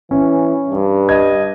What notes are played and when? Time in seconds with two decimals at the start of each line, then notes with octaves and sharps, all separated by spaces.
0.11 E3 C#4
0.69 G2
1.09 D#5 G#6